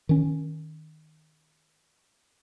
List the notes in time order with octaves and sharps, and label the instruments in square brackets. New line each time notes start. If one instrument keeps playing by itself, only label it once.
[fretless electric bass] D#3 C#4